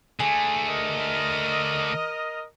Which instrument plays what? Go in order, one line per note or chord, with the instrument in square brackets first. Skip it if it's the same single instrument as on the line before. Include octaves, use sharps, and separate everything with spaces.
[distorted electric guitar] D3 A3 [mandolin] G#4
[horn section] A#4 D#5